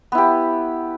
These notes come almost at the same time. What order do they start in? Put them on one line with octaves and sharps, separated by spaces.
B3 E4 G4